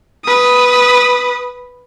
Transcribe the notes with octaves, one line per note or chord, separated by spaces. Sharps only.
B4 D#6